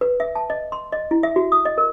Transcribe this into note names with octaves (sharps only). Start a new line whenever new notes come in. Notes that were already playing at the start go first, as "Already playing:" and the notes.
B4
E5
A5
D#5
C6
D#5
E4
E5
F#4
D#6
D#5
A#4